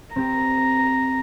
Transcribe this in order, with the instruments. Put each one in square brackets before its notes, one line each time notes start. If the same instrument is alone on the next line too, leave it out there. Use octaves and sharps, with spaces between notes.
[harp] C4 G4 [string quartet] A#5